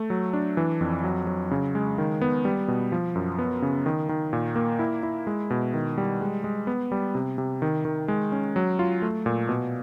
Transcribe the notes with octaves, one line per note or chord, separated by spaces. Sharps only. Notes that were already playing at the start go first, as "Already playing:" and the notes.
Already playing: A3
F#3
D4
E3
F2
F#3
F#3
C#3
G#3
D#3
B3
G3
B2
F3
F#2
B3
C#3
D#3
D#3
A#2
A#3
E4
E4
G#3
B2
D#3
G3
G#3
G#3
B3
G3
C3
C3
D#3
D#3
G#3
C#4
F#3
F4
A3
A#2
B2